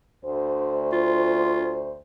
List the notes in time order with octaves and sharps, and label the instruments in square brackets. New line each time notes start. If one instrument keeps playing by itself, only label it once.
[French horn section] D2 C5
[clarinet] F4